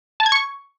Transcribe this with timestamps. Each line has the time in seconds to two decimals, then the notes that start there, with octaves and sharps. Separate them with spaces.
0.20 A5
0.26 G#6
0.32 C#6